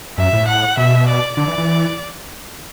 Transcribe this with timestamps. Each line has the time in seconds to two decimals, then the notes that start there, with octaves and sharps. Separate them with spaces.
0.18 F#2 E5
0.33 A2
0.48 F#5
0.77 B2 E5
1.08 D5
1.37 D3 D5
1.47 E3
1.58 E3